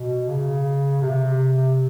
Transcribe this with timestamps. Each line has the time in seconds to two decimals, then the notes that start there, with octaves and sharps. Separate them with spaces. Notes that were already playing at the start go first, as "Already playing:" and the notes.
Already playing: B2
0.28 C#3
1.02 C3